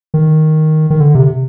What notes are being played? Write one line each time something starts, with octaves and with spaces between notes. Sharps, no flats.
D#3
D#3
D3
C3